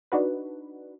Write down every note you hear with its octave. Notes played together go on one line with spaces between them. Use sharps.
D4 D#4 F#4 B4